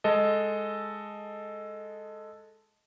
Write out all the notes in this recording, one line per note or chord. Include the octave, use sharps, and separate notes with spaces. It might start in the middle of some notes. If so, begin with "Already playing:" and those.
G#3 A4 D#5